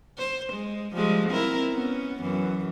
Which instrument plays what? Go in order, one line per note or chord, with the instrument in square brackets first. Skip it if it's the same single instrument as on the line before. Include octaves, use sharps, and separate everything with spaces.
[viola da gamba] C5
G#3
F3 G3 G#3
C4 E4 A#4
B3 C#4
F#2 E3